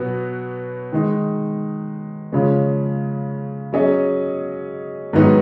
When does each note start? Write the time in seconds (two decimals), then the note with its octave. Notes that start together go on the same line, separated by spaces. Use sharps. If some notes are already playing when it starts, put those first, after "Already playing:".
Already playing: B2 F#3 B3 F#4
0.92 D#3 G#3 D#4
2.32 C#3 F3 G#3 C#4
3.73 F#3 C#4 G#4 D#5
5.13 G#2 D#3 F#3 B3 D#4